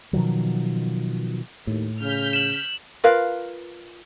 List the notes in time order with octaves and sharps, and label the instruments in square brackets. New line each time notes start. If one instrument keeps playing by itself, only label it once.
[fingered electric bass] B2 D#3 F3 F#3
[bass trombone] D#2 [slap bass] A2
[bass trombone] C#3 [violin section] F6 G6 B6
[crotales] E7 F#7
[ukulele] F4 A#4 B4 F5